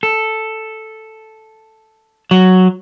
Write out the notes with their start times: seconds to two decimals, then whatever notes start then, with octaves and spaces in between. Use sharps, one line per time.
0.03 A4
2.31 F#3